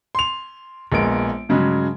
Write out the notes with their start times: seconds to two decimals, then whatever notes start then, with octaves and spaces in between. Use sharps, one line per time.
0.15 C6 F7
0.92 A#1 G#3 A#3 B3 D7
1.49 G2 C#3 F#3 G#3